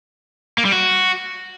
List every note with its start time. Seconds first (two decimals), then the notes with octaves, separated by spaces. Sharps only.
0.58 A#3
0.65 G3
0.72 F#4